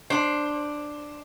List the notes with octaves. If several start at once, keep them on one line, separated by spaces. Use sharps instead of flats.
D4 C5